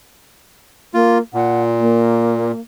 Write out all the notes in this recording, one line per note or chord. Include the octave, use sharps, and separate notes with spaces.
A#3 F4
A#2 F#5
A#3